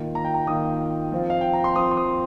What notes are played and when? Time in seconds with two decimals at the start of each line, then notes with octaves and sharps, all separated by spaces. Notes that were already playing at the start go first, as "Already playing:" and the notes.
Already playing: D#3 A#3 F4
0.15 A#5
0.25 G5
0.34 A#5
0.47 D#3 A#3 F4 D#6
1.12 F3 C4 F4
1.30 F5
1.41 G5
1.53 A#5
1.64 C6
1.76 F3 C4 F4 D#6
1.91 C6
1.97 D#6